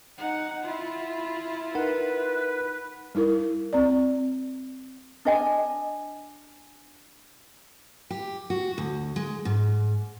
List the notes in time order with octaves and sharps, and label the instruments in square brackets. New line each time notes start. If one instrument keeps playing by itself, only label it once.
[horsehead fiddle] D#4 F#5
E4 F4
[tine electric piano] D#4 A#4 F#5 [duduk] B4
[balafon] G3 D#4 E4 A#4
C4 D5
[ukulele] D4 D#5 G#5
[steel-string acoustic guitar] G4
F#4
D2
G#3
G#2